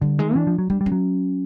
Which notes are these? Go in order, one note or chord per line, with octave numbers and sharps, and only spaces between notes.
D3 G3
D#3 G#3
E3 D4
F3
F#3
G3 D4
G3
C#4
F#3